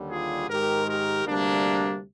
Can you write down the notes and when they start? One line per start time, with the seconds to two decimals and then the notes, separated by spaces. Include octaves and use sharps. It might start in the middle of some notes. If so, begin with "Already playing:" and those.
Already playing: D#2 D3 G3
0.09 F4 G#4
0.49 G#2 D#3 G#3 G4 A#4
0.87 G4 A#4
1.26 D2 C3 G3 A#3 D4